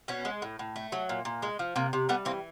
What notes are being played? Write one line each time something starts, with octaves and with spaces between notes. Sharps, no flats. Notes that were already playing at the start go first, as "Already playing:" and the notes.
B2 B3 C#4
G#3
A2
A2
A3
F#3
A#2
A#2
G#3
F3
C3 A#3
C3
G3 A3 B3
E3 A#3 C4